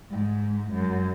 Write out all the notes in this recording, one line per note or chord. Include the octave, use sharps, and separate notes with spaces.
G#2
F#2